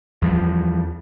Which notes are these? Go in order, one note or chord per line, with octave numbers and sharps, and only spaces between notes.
E2 F3 G3